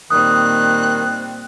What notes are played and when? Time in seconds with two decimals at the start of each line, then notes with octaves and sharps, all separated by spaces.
0.10 A#2 D#3 G3 C4 D#6 F#6